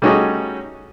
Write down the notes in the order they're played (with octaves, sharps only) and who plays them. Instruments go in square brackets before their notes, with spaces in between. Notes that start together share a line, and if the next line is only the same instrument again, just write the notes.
[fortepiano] G3 A3 C#4 D#4 F#4 G#4